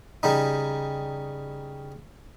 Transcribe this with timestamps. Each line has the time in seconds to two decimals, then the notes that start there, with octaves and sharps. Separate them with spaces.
0.23 C#3 G3 D#4